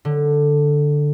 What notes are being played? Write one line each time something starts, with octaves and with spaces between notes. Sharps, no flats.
D3